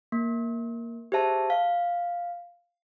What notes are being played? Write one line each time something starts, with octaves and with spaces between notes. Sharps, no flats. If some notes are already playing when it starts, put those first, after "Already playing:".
A#3
G4 G#4 C5 E5 A5
F5